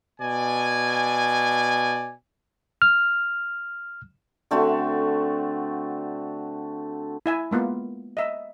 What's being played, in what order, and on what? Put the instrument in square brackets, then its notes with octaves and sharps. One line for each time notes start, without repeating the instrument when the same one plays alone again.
[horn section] B2 D5 G#5
[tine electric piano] F6
[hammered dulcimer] D3 A3 C4 F#4
[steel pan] E4 E5 G#5
G#3 A#3 B3 F4
D#5 E5